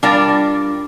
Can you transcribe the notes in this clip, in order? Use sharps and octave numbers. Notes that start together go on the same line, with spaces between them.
G3 D4 F4 A#4